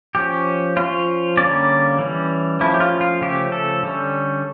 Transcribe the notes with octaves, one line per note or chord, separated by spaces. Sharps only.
F3 C#4 G4
F3 C#4 F4
D3 G3 A#3 C#4 D5
E3 G3 C#4
F3 A3 C#4 E4
G4
F4
F4
C#3 F3 A3 C#4 G4
A4
D3 G3 C#4